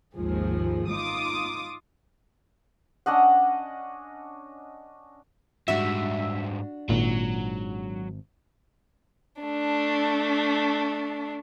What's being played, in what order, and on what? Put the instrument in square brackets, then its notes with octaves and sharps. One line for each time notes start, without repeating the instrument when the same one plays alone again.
[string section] G#1 D#2 G#2 F3 G#4
D#4 F4 D6 D#6
[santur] C#4 D4 D#5 F#5
[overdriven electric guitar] G#2 G3 [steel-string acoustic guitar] D4 F#4 [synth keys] E5
[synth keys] G#1 [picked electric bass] A#2 [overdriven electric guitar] F#3
[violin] A3 D4